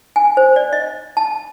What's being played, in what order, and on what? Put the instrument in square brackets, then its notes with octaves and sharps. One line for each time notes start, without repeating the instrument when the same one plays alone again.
[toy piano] G#5
C5
D5
D#5
A5